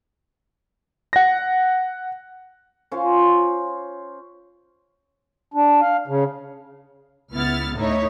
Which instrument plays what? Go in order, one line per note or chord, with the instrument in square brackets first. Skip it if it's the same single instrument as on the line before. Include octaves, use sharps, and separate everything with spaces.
[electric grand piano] F#5 A#6
[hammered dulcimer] C#4 F4 C5 F5
[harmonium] D4
F5
C#3
[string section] C#2 B3 E4 F6 A6
D2 A2 D#4 E4 C#5